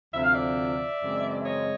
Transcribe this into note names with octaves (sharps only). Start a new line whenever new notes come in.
D2 C3 F3 E5
F5
D5 E5
F#2 C#3 E3 G#3 C4
C#5 D#5